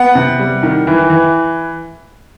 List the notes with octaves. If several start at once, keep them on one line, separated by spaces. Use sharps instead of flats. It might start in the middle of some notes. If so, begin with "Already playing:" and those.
Already playing: B3 F#5
C3
G3
D#3
E3
E3